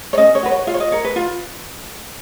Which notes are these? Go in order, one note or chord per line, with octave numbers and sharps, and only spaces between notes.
C#5
C#4 D#5
C#5
F#4 B4
C#5
F4 F5
C#5
D#5
A#4 C#5
B4
F4